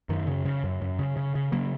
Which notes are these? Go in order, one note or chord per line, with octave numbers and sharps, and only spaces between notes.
F#2 D#3
C#3
C#3
F#2
F#2
C#3
C#3
C#3
C#3 F#3 A#3